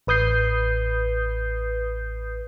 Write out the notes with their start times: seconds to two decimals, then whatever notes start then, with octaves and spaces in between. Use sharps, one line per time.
0.07 A1 B4 D#6 G6 C7